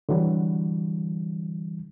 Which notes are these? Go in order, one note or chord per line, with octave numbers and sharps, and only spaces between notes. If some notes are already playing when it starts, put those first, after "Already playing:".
D3 E3 F#3 G3